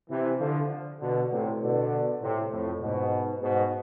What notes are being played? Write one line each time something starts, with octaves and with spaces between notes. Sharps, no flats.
C3 E3
D3 F3
B2 D3
A2 C3
B2 D3
A2 C3
F2 A2
G#2 B2
G#2 B2